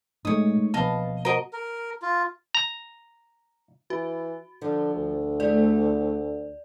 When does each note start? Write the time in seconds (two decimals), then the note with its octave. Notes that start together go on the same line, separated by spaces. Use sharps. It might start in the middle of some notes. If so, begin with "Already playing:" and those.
0.25 A#2 G#3 A3 D#4 C#5 D#6
0.74 B2 F3 A#3 B4 D#5 F5 A5
1.25 F#4 A#4 C5 D#5
1.53 A#4
2.02 F4
2.55 A#5
3.90 E3 F#4
4.62 D3 F3
4.93 D2
5.40 A3 E4 G#4 D5